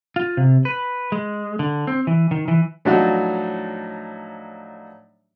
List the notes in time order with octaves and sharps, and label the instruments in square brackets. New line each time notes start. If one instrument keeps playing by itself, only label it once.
[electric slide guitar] F4
C3
B4
G#3
D3
C4
E3
D#3
E3
[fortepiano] A2 F3 F#3 D4 D#4 F#4